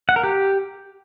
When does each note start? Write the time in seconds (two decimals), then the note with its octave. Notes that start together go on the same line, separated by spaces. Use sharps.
0.09 F#5
0.16 A#4
0.24 G4